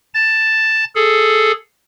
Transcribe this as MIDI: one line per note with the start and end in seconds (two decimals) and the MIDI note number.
0.14 0.84 81
0.14 0.84 93
0.95 1.52 68
0.95 1.52 69